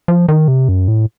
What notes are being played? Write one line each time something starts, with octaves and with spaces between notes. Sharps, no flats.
F3
D#3
C3
F#2
A2